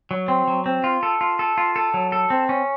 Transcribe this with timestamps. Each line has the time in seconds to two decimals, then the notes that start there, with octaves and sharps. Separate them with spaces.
0.11 F#3
0.28 C4
0.48 F#3
0.66 C4
0.84 F4
1.03 A4
1.21 F4
1.39 A4
1.58 F4
1.76 A4
1.94 F#3
2.12 A4
2.30 C4
2.49 C#4